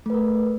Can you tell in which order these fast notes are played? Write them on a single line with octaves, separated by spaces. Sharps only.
A3 B4 A#4